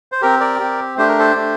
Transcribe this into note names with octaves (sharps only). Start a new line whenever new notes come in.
C5
C4 G4 A#4
A#4 D5
C4 G4
A3 D4 G4 C5
A#4
A4 C5
A3 D4 G4